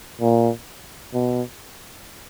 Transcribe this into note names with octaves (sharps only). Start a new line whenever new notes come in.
A#2
B2